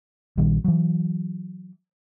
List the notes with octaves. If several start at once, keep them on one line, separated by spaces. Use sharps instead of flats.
A#1 D#3 G3
E3 F#3